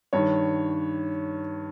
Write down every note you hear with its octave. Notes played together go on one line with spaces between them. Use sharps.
G2 D#3 C#5